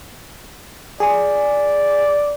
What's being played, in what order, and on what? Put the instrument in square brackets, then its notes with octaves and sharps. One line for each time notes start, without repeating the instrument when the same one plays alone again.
[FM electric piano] G#4 [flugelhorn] D5